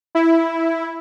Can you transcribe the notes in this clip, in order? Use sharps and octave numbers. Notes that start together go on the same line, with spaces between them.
E4